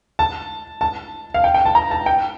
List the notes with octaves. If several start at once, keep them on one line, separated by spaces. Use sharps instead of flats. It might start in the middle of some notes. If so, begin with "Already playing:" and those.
A5
A5
F5
G5
G5
A5
A#5
A5
G5